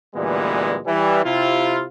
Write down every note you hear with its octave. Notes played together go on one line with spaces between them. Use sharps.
D2 A#2 E3 G3 G#3 B3
E3 G3
C3 E4 F4